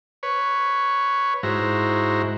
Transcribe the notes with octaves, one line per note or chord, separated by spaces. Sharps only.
B4 C#5
G#2 E4 F#4 C5 A#5